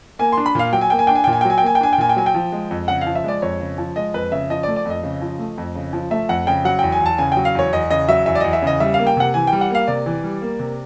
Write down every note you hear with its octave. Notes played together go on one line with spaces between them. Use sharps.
A#3 G#5
D4 C6
B5
A#2 F5
F#3 G5
G#5
A#3 G5
G#5
D4 G5
G#5
A#2 G5
G#5
G5
F#3 G#5
G5
A#3 G#5
G5
D4 G#5
G5
A#2 G#5
G5
F#3 G#5
G5
F3
G#3
F2
C#3 F#5
F5
F3
E5
G#3 D5
F2 C#5
C#3
F3
G#3 D#5
F2 B4
C#3 E5
F3 D#5
D5
A3
D5
F2 D#5
C#3
F3
A3
F2
C#3
F3
A3 E5
F2 F#5
C#3 G5
F#3 F#5
E2 G5
G#5
E2 A5
C#3 G#5
G5
F#3
F5
E2 C#5
E2 D#5
C#3 D#5
F#3 E5
E2 E5
D5
E2 D#5
E5
C#3 D#5
G3 E5
A#3 F5
G5
C3 F#5
E3 G#5
G5
G3
F#5
A#3 F5
C3 D5
E3
G3
A#3
C3